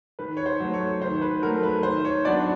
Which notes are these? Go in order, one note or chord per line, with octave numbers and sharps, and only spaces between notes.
D#3 B4
C#5
C5
F#3 A3
C#5
D#3 C5
B4
F#3 A3 A#4
B4
D#3 C5
C#5
F#3 B3 D4 D5